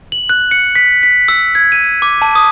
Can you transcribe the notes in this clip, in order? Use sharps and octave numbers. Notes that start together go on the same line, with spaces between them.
F#7
F#6
C#7
B6
B6
E6
G#6
D#7
D6
A5
D#6